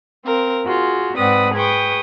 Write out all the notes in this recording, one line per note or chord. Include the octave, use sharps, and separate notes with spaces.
C4 A#4 F5
F4 F#4 G#4
G#2 C4 B4 D5 F#5 D#6
G#4 B4 G5 C#6 D#6